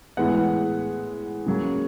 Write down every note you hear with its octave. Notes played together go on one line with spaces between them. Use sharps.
A2 E3 G#3 B3 F#5
C#3 F#3 A#3